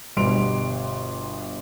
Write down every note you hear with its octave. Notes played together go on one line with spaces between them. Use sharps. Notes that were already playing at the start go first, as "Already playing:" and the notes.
G1 B2 G3 C6 D7 F7